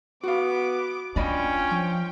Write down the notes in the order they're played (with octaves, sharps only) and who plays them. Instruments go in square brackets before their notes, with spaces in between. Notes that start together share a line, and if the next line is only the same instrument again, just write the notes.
[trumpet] B3 [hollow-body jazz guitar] F#4 F5 [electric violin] D6
[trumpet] C#4 [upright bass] D4 [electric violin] F4 G5 [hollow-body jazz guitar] D5 D#5 B5
[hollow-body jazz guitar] F3